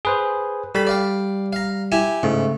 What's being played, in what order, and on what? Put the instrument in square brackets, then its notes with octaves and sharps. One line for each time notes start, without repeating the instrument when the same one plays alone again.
[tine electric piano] G#4 B4 C5
[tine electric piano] G3 [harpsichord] A4 B5
[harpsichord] D5 F5 G5
F5 A#5
E4 G4 G#5
[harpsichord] G#2 [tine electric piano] C#3 A3